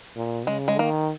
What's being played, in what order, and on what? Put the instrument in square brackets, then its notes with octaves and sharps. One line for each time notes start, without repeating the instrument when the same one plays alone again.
[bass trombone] A#2
[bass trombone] C#3 [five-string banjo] G#3
[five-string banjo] G#3
[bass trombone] D#3 [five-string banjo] A#3